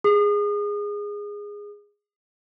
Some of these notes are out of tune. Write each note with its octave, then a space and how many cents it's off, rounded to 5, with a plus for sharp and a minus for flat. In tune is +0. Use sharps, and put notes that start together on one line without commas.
G#4 -10 D#6 -35